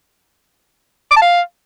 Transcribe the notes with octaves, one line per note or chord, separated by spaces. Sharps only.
D6
A5
F5